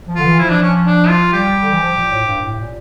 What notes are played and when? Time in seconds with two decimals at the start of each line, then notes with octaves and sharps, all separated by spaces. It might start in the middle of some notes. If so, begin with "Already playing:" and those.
0.08 F3
0.16 D3 F4
0.24 E3
0.39 F3 E4
0.50 D4
0.62 C#4
0.86 D4
1.09 F4
1.32 G3 G4
1.61 D3
1.69 E3
1.80 F3
1.95 A#2
2.10 A2
2.26 G2
2.41 A2
2.57 A#2